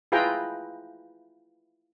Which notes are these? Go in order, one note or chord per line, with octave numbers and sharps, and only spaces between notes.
E4 F4 G#4 B4 G5 A#5